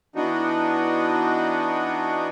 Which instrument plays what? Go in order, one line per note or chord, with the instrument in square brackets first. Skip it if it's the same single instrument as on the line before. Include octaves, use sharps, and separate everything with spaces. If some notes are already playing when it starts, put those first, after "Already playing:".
[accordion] E3 B3 D4 D#4 F#4